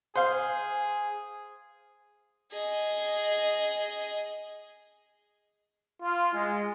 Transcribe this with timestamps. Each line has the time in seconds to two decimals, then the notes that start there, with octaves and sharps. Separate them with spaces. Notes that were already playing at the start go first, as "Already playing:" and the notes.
0.16 G#4 C5 F5
2.53 G#4 D#5
6.02 F4
6.33 G#3